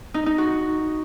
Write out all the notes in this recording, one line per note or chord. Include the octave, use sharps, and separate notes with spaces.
D#4
D#4
F#4